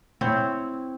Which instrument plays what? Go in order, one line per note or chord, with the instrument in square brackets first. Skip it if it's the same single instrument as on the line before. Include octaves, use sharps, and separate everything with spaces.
[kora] C4 E4 C#5